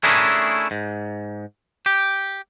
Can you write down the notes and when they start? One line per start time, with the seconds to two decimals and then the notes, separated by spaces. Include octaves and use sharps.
0.03 A3 C#4 D4 E4 G#4 A#4
0.71 G#2
1.86 G4